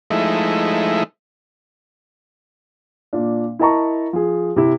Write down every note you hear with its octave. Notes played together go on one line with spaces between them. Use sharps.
F3 G#3 A3 D#4 E4
A#2 D4
E4 A#4 D#5 A5 A#5 C#6
F3 G#4
C3 E4